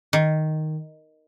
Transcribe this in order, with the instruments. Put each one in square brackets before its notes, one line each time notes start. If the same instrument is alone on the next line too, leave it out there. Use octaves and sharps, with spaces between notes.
[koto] D#3